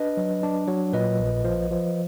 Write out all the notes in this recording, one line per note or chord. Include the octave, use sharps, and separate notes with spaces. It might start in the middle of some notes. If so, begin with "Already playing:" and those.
Already playing: D4 B4 D#5
F#3
D4
F#3
A#2 B4 D#5
A#1
F3
F3